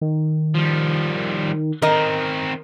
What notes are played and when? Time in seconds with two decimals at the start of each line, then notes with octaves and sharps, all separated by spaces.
0.01 D#3
0.55 F3 G3
1.82 D#3 C4 A#4 D#5